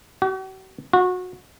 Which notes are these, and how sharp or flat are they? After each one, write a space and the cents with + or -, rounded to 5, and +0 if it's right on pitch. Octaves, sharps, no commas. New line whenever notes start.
F#4 +45
F#4 -25